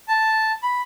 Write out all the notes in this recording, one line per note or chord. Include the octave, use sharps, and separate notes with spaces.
A5
B5